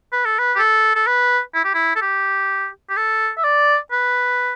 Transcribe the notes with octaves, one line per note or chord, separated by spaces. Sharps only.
B4
A4
B4
G4
A4
A4
B4
E4
G4
E4
A4
G4
G4
A4
E5
D5
B4